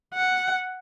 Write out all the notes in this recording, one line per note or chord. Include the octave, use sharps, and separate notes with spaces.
F#5